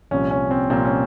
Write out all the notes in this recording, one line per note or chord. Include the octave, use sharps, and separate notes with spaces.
C2 A#2 F3 C#4
C#4
C4
C2 A#2 F3 C4
C#4